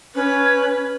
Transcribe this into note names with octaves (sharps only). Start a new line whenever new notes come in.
C#4 B4